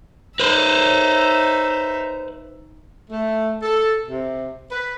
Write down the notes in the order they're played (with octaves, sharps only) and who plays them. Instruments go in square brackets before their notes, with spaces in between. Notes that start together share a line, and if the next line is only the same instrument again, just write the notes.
[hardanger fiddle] D#4 E5 [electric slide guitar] B4 C5
[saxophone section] A3
A4
C3
B4